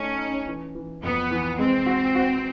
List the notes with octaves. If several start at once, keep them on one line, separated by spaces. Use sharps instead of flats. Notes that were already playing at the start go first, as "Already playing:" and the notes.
Already playing: A3 C#4 D#4
D#4
E3
E3
F2 B3
E3
G#3 C4
F#4
F#4